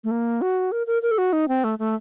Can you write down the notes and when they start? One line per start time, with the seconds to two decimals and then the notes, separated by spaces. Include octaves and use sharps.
0.04 A3
0.11 A#3
0.42 F#4
0.72 A#4
0.87 A#4
1.02 A#4
1.11 A4
1.18 F#4
1.33 D#4
1.48 C4
1.64 A3
1.79 A3